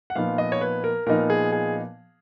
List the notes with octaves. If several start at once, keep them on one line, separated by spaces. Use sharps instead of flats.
F#5
A#2 F3 B3 D#4 F5
D#5
C#5
B4
A#4
A#2 F3 B3 D#4 A#4
G#4
G#4